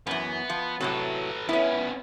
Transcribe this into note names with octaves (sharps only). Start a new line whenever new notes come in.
F#2 E3 B3
F3
A2 C3 F#3 A4 B4
B3 C#4 E4 B4